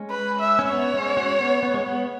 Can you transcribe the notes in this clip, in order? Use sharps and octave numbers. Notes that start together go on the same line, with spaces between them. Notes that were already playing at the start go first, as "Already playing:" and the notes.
Already playing: G#3 C#4
B4
E5
C#4
B3 C#5
G#3 C#4
C#4 F#4
B3
B3
G#3
B3